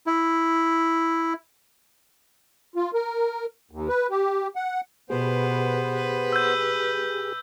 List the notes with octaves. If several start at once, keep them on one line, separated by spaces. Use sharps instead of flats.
E4
F4
A#4
D#2
B4
G4
F#5
B2 B3 G4 G#4 B4 C5
B4
E6 G6